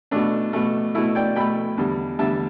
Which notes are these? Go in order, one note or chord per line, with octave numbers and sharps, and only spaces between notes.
B2 A3 D4
B2 A3
B2 A3 E4
D5 G5
B2 A3 G5 B5
E2 D3 G3
E2 D3 G3 E5 A5